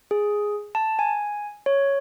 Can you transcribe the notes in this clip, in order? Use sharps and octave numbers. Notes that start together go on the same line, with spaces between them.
G#4
A5
G#5
C#5